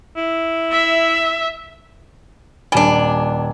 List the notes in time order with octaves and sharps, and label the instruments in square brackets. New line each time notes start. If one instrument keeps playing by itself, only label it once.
[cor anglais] E4
[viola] E5
[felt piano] D#1 G#5 [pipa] G3 D4